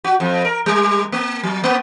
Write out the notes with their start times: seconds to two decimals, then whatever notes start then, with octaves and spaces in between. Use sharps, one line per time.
0.04 F#4
0.20 F2
0.45 A#4
0.66 G3
1.12 A#3
1.43 F#3
1.64 A#3